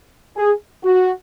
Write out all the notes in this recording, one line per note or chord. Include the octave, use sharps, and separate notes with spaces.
G#4
F#4